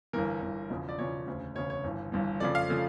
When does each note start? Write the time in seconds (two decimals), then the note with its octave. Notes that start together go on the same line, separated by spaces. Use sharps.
0.13 G1 G2 E3 A#4
0.42 G1 G2 E3
0.70 E1 E2 C#3 F3
0.89 D5
0.98 E1 E2 C#3 F3 C#5
1.27 E1 D2 C#3
1.55 E1 D2 C#3 C#5
1.70 C#5
1.84 G1 G2 E3
2.12 G1 G2 E3
2.40 F2 C#3 F3 A3 D5
2.55 F5
2.69 C#3 F3 A3